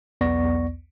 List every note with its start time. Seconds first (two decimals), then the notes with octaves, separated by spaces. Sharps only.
0.21 B1 E2 B3 D5 C#6 A#6